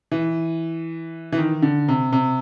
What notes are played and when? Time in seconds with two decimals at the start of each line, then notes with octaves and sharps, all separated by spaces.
0.11 E3
1.32 E3
1.38 D#3
1.62 D3
1.88 C3
2.13 C3